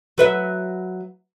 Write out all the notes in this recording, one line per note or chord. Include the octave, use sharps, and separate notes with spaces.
F#3 B4 E5